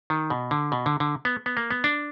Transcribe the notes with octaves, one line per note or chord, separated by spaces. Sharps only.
D#3
B2
D3
B2
D3
D3
B3
B3
A#3
B3
D4